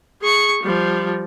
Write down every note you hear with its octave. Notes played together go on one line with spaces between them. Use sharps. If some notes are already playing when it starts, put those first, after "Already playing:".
G#4 C#6
F3 G3